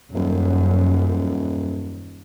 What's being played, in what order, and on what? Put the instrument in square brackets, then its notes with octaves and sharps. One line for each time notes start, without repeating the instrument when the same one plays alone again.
[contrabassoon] D#1 [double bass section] F#2